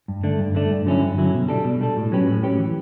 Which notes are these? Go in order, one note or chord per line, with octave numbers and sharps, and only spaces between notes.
G2
D3 A3 D4
G2
D3 A3 D4
G2
D3 F#3 C#4 E4
G2
D3 F#3 C#4 E4
B2
G3 D4 A4
B2
G3 D4 A4
A2
F#3 C#4 G4 B4
A2
F#3 C#4 G4 B4
E3